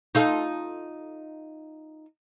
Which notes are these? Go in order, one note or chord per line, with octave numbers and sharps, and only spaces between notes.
D#4 F4 A4